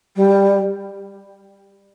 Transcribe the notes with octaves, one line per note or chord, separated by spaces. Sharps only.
G3